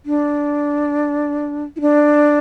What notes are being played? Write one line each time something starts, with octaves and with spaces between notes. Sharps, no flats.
D4
E4
D4